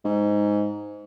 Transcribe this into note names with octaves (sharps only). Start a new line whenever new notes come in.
G#2